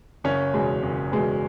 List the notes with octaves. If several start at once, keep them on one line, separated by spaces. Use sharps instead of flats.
F#1 C#4
E2 B2 G#3
F#1
E2 B2 G#3